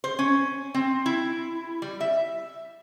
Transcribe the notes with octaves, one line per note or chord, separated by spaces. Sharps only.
C5
C#4
C4
E4
G3
E5